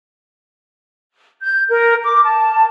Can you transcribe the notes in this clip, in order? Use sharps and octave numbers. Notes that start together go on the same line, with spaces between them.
G6
A#4
D6
A5